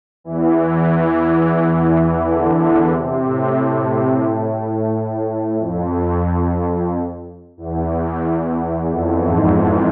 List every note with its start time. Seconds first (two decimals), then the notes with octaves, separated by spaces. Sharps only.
0.24 E2 E3
0.91 E2 E3
2.25 D3
2.91 C3
3.25 A2
5.57 F2
7.57 E2
8.90 F2
9.23 G#2